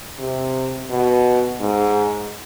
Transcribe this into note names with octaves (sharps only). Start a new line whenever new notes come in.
C3
B2
G#2